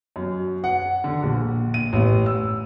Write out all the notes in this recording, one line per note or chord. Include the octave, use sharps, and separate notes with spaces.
F#2
F#5
D3
A#1
D#7
A1
E6